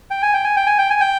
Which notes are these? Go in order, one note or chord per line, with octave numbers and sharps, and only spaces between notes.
G5
G#5
G5
G#5
G5
G#5
G5
G#5
G5